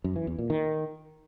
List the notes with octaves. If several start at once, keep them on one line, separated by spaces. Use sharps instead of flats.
F#2
E3
E2
A#2
D#3